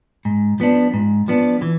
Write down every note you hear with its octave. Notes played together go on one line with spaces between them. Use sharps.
G#2
F3 B3 D4
G#2
F3 B3 D4
E3